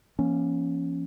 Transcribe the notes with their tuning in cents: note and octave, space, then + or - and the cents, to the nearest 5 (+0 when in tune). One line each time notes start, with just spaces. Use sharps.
F3 -45 A#3 +35 C#4 +0